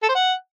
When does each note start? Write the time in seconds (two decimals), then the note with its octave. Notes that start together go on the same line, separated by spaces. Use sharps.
0.03 A4
0.09 C5
0.15 F#5